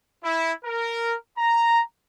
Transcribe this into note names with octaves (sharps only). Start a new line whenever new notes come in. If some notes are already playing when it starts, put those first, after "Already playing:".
E4
A#4
A#5